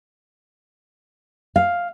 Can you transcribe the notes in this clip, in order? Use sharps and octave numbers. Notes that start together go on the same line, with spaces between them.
F5